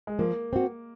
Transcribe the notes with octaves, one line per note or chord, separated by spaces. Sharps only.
G#3
F3 A#3
C4 F#4